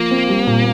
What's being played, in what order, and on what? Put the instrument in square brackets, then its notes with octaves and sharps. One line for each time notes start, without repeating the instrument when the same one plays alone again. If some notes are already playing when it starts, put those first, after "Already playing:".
Already playing: [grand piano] F3 F4 [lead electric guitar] A#3
[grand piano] C4
G3
A#2